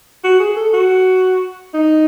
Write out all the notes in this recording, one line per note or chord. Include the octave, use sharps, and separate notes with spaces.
F#4
G#4
A4
F#4
D#4